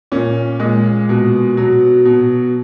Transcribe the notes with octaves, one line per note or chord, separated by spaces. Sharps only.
A#2 C#4
A#2 G#3
B2
B2 F#3
B2